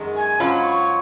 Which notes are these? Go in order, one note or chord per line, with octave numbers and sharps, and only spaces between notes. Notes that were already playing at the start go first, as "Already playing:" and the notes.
Already playing: F#2 D#3 G#3
G#5
G#2 F#3 C#4 F4 B5
C#6